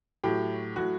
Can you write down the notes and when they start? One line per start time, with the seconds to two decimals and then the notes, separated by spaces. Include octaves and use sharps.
0.24 A2 F#3 G4
0.76 A2 F#3 F#4